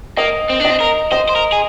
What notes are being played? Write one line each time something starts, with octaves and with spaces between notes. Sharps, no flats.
A#3 D#5
C4
D4
D#5
C4
A#4
C5 D#5
C5
A#4
G#4